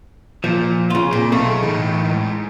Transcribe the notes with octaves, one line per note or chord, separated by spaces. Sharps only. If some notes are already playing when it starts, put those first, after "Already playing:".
A#2 F3
C#3 F4
A#2 C4
B1 A3 G#4 F5
A2 E3 D#4
G#2